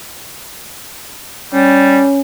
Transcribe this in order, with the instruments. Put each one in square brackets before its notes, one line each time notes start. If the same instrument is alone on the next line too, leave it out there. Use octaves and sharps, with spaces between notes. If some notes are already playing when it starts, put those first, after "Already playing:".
[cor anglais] G3 [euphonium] C#4